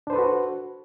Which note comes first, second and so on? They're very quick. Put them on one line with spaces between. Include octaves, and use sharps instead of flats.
D4 C5 B4 A4 F#4